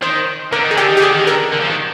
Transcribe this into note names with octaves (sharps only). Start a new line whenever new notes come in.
D#3 C5
D3 A#4
D#3
G#4
D3 G4
D#3
G4
D3 G#4
D#3
D3 A#4
D3
F3
D#3